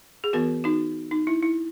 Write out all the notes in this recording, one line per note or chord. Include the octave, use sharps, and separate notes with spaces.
G#4
E3 B3 F#4 A#4
D#4 F#4
D#4
E4
E4